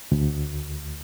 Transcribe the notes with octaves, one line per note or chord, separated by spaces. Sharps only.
D2